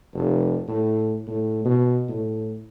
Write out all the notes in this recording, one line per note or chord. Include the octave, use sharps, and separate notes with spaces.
F1
A2
A2
B2
A2